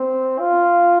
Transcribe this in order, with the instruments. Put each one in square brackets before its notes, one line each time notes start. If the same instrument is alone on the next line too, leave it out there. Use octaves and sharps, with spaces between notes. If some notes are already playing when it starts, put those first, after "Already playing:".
Already playing: [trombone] C4
F4